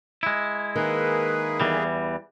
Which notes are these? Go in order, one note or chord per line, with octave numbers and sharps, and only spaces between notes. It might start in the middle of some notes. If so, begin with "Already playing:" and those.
G#3 E4
D#3 A#3 G#4 B4
E2 E3 G3